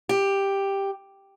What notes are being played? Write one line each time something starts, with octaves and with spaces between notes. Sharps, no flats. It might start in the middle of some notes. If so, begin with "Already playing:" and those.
G4